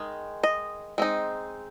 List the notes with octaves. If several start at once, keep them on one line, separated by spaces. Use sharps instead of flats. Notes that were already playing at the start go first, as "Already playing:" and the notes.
Already playing: D#3 G#3
D#5
G#3 C4 D#4